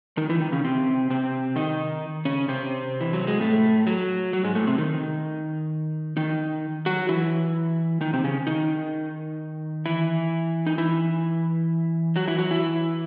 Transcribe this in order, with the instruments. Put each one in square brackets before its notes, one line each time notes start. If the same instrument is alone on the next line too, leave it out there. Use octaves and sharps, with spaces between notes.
[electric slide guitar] D#3 D#4
E3 E4
D#3 D#4
C#3 C#4
C3 C4
C3 C4
D#3 D#4
C#3 C#4
C3 C4
E3
F#3
G#3
A2 A3
F#3
F#3
G#2 G#3
A2 A3
C3 C4
D#3 D#4
D#3 D#4
F#3 F#4
E3 E4
D#3 D#4
C3 C4
C#3 C#4
D#3 D#4
E3 E4
D#4
E3 E4
F#3 F#4
E3 E4
F#3 F#4
E3 E4